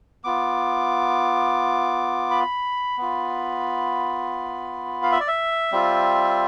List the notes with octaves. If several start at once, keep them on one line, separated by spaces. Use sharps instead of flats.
B3 F4 D6
B5
B3 F4
F5
E5
D5
E5
G3 C4 F4